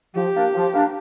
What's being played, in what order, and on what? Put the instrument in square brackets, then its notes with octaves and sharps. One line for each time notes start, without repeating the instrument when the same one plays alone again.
[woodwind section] F3 [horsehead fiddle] G4
[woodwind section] A#3 D4
F3
A#3 D4